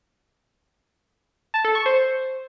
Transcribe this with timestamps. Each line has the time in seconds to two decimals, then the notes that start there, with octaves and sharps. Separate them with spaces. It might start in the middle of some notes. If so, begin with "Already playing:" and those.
1.54 A5
1.65 A4
1.75 C#6
1.86 C5